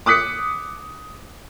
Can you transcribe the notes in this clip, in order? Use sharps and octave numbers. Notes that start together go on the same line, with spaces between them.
D6 D#6 F#6 B6 C#7